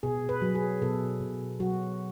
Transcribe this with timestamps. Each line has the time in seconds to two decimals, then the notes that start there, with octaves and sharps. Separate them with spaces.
0.03 B2 G#4
0.29 B4
0.42 F#3
0.55 G#4
0.82 B2 A4
1.21 B2
1.60 F#3 F#4